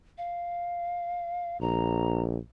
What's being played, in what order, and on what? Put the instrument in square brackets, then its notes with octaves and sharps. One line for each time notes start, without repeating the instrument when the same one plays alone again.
[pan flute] F5
[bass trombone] A#1 [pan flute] A#5